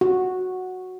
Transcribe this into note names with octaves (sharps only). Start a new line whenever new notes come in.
F#4